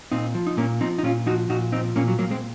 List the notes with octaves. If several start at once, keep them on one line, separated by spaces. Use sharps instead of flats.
A#2 C4 D#4
F3
D#4
A#2 A#3 C#4
F3 C4 D#4
D#4
A#2 C#4 F4
F3 D#4 F#4
A#2 D#4 F#4
F3 C4 D#4
A#2 A#3 C#4
F#3
A#2 F#3 A#3
G#3 C4